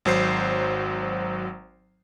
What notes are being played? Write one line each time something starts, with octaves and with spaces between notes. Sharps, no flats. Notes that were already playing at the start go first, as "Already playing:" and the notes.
G#1 F#3 C5 C7